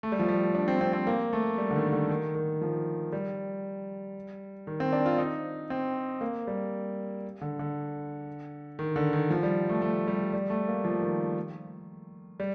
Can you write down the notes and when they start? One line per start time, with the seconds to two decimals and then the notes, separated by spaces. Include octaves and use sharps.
0.03 A3
0.12 G3
0.19 F3
0.28 G3
0.55 D4
0.68 C4
0.81 C4
0.93 C4
1.07 A#3
1.33 A3
1.58 G3
1.70 D3
1.76 D#3
1.92 D3
2.09 D#3
2.35 D#3
2.61 F3
3.13 G3
4.67 D#3
4.80 C4
4.93 D4
5.06 F4
5.18 D#4
5.70 C4
6.21 A#3
6.47 G3
7.41 D3
7.59 D3
8.79 D#3
8.96 D3
9.13 D#3
9.30 F3
9.43 G3
9.69 A3
9.82 A3
10.08 G3
10.33 G3
10.50 A3
10.68 A#3
10.85 F3
11.02 D#3
12.40 G3